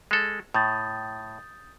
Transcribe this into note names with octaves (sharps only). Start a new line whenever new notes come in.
G#3 A4
A2 D#6 G6 A6